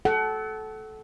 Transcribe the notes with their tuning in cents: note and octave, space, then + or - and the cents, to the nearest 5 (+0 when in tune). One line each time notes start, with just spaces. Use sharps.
A4 -20 F#5 +30